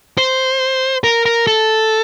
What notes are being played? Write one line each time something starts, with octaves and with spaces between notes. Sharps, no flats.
C5
A#4
A#4
A4